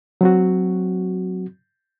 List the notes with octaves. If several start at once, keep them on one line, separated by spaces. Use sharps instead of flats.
F#3 C4 F#4